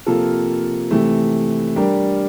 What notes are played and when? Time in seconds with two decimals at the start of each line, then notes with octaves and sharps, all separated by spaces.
0.06 C3 F3 A#3 F4 A4
0.91 C3 E3 A3
1.76 G3 D4 G4 A#4